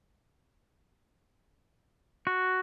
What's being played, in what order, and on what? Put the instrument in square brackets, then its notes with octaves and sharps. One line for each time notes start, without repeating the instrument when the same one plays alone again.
[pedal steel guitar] F#4